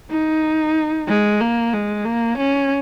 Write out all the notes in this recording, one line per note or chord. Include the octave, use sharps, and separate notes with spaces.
D#4
G#3
A#3
G#3
A#3
C#4